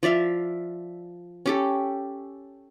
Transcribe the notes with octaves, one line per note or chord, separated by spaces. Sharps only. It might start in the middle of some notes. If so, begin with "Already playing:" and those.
F3 D5 E5 F5
C#4 G4 A4